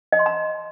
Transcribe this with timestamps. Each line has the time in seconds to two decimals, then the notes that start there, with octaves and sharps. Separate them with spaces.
0.12 D#5
0.19 C6
0.26 A#5